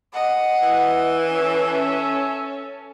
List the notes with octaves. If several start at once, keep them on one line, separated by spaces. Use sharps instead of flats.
D#5 F#5
E3
C#4 A4 E5